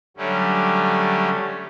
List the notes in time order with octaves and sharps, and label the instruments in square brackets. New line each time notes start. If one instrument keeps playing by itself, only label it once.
[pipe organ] D3 F#3 G3 A3 C#4